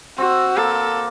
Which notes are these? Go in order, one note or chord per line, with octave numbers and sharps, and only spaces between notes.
C4 F#4
A#3 A4